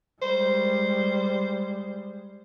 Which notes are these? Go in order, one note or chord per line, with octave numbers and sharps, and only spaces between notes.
G3 G#3 C5